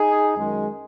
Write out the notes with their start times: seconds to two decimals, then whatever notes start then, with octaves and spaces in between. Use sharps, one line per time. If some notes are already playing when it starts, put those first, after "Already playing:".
Already playing: D#4 G#4
0.36 F#2 D#3 G#3